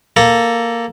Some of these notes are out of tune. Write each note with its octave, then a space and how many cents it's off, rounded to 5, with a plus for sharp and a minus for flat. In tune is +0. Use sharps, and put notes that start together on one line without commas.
A#3 +0 A4 +5